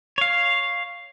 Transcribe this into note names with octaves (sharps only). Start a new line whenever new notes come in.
C#5 F5